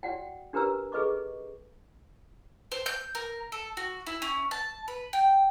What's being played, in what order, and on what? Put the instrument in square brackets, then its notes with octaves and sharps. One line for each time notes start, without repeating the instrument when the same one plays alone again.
[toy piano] F#4 D5 F#5 G5
D4 G4 A#4 B4 A#5 E6
G#4 A4 B4 D#5 C#6 D6
[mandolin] C5
G6
A#4
A4
F#4
E4
C#4
A5
B4
G5